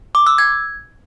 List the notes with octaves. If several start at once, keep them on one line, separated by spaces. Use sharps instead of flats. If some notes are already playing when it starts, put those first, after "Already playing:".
D6
E6
G#6